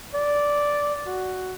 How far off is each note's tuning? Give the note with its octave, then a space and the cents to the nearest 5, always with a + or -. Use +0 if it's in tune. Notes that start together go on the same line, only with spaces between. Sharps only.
D5 -5
F#4 +5